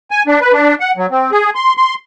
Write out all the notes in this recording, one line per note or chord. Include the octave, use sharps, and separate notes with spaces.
G#5
D4
B4
D4
F#5
F#3
C4
G#4
C6
C6